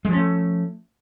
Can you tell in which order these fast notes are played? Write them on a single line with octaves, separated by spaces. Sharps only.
G#3 F3 C#4 A3